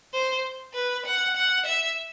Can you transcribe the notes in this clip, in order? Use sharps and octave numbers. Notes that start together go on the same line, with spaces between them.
C5
B4
F#5
F#5
E5